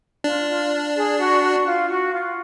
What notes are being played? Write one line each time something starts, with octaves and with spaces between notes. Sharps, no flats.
D4 F4
F4
G#4
F#4
F#4
F4
F#4
F4